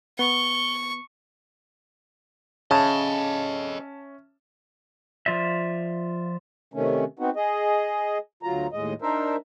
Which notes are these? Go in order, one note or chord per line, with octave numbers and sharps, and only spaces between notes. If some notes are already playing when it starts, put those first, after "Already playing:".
B3 C#6 G7
C#3 C#4 A4 D#5 E5 A5
F3 F4 D5 E5
C3 D#3 A3 C#4
B3 C4 D#4 F#4
G#4 D#5
D2 F#3 F4 A#5
D#2 A2 G#3 D#5
D4 D#4 A#4 C5 E5